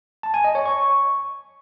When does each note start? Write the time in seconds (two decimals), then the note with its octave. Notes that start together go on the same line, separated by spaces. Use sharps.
0.23 A5
0.34 G#5
0.44 D#5
0.55 C#5
0.66 C#6